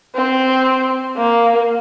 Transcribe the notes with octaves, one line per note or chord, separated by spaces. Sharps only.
C4
A#3